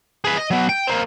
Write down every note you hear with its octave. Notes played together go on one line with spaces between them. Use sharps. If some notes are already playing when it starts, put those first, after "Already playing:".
G#4 B4
D#5
F#3 B3
G5
A#3 C4